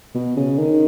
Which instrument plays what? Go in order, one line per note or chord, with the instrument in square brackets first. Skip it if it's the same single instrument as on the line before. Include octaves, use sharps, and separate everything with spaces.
[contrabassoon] B2
C#3
D#3